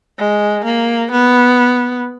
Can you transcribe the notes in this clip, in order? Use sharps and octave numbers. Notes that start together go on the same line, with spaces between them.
G#3
A#3
B3